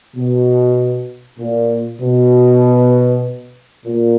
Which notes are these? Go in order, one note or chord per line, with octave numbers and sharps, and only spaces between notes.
B2
A#2
B2
A#2